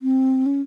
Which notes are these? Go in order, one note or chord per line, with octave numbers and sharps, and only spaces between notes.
C4
C#4